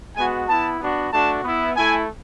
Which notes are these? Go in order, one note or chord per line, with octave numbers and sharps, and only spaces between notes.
G#3 B3 F#4 G#5
B3 E4 A5
B3 D4 F#4
A3 D4 F#4 A5
B3 E4
A3 E4 G#5